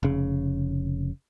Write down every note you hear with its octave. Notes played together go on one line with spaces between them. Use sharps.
F1 C#3